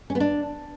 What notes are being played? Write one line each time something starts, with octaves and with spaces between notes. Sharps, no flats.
C#4
B3
D4